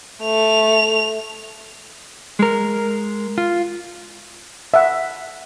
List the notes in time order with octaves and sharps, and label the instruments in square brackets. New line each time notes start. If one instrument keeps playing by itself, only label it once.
[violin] A3 F7
[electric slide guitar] G#3 A#4
F4
[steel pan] E5 F#5